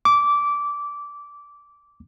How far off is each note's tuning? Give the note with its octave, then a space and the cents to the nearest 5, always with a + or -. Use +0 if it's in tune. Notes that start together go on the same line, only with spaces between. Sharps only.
D6 -15